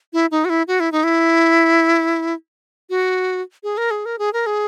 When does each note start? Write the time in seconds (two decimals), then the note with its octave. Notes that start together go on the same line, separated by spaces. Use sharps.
0.13 E4
0.31 D#4
0.45 F#4
0.49 E4
0.68 F#4
0.80 E4
0.92 D#4
1.04 E4
2.90 F#4
3.63 G#4
3.77 A#4
3.91 G#4
4.05 A#4
4.19 G#4
4.33 A#4
4.46 G#4